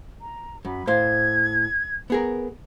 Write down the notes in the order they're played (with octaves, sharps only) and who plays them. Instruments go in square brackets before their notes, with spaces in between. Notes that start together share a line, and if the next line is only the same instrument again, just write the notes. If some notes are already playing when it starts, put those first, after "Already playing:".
[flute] A#5
[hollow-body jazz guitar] F#2 [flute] B5
[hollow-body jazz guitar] A2 C5 F5 [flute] G#6
[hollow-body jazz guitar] B3 G#4 A#4